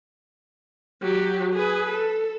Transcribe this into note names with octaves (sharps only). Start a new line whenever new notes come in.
F#3 G4
G#4 B4
A4